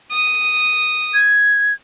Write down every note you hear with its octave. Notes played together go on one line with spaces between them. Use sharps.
D#6
G#6